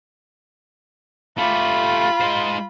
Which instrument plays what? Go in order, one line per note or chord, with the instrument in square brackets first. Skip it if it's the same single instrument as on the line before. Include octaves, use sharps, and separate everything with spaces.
[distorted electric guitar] A3 G4 [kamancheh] F4 B5
[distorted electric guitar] G#3 C5